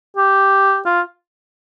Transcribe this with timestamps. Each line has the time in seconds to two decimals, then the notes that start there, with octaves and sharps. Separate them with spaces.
0.17 G4
0.86 F4